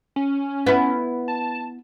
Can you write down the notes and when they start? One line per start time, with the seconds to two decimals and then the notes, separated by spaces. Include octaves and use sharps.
0.16 C#4
0.66 B3 E4
1.28 A5